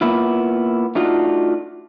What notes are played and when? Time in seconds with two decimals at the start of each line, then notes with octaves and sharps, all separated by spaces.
0.01 A#3 B3 E4 F4
0.95 A3 D4 D#4 F4 F#4